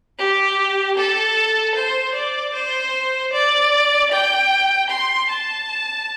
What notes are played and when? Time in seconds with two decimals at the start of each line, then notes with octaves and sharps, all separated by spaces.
0.19 G4
0.97 A4
1.75 C5
2.15 D5
2.54 C5
3.33 D5
4.11 G5
4.90 C6
5.30 A5